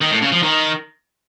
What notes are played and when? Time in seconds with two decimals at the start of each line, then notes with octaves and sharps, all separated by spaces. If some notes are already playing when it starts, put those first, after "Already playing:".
0.01 D#3
0.11 A2
0.22 C#3
0.32 F3
0.42 D#3